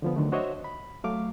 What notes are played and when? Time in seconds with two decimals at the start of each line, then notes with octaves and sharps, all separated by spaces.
0.02 D3 F3 B3
0.16 D3 D#3 F#3 A3
0.32 D4 F#4 C5 C#5 D#5 E5
0.64 B5
1.04 F#3 A3 F5 D6